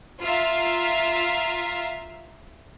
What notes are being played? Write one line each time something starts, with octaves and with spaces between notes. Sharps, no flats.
F4 E5 F5 A#5